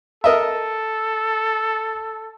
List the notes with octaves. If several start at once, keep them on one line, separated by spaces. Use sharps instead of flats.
A4 A#4 D#5 E5